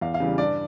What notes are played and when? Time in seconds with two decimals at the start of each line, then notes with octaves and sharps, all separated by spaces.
0.01 E2 F5
0.14 F5
0.20 C#3 E3 G3
0.38 G2 D5